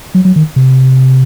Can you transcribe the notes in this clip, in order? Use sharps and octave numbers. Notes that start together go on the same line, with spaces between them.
F#3
F#3
D#3
C3